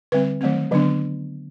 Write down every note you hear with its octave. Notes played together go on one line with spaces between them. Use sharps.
D3 G3 C4 B4
D#3 F#3 A3 C4
D3 F#3 B3 D4